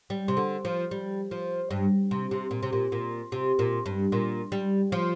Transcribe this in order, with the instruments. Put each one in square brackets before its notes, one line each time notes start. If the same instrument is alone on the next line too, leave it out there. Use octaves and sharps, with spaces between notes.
[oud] G3
C3
D3
F3
G3
F3
G2
C3
C3
A#2
C3
A#2
A#2
C3
A#2
G2
A#2
G3
F3